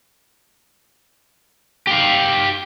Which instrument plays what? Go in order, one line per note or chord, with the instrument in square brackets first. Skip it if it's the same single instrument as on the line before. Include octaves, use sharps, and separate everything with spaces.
[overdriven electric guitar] G4 F5